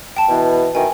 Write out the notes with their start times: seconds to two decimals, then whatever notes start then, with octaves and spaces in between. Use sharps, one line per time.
0.16 G5 A5
0.29 B2 E3
0.75 B2 D#3 E3 G5 G#5